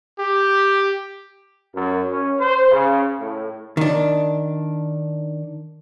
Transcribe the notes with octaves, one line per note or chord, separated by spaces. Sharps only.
G4
F#2
C#4
C5
C#3
A2
D#3 D4